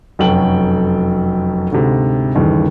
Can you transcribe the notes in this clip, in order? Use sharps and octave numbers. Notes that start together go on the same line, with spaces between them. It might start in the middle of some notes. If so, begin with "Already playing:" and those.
F1 F#2 F#4 A4 G5 F#7
D2 G#2 C3
G1 D#2 C#3 E3